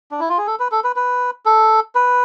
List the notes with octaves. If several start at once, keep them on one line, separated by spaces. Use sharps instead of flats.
D4
E4
F4
G#4
A4
B4
A4
B4
B4
A4
B4